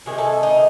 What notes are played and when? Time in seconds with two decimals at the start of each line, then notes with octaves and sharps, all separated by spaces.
0.06 C3 D#3 G#3 G#4
0.18 A4
0.43 D#4